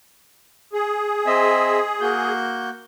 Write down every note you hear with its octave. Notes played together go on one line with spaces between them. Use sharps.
G#4
C4 D#5 E5
A#3 F#4 G6